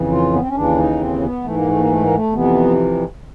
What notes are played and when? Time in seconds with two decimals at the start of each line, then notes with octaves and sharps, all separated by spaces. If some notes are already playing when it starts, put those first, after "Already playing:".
Already playing: F2 C#3 E3
0.12 F4
0.33 B3
0.41 C4
0.48 C#4
0.55 D#2 C#3 E3 D4
0.78 D#4
1.00 C4
1.23 B3
1.44 G#2 E3 A3
1.56 A#3
1.68 A3
1.79 A#3
1.91 A3
2.03 A#3
2.14 A3
2.33 F2 C3 E3 B3